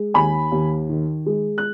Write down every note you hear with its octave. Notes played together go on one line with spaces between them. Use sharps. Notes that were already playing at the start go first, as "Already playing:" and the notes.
Already playing: G#3
D#2 G#5 B5
D#2
D#3
G#3
F#6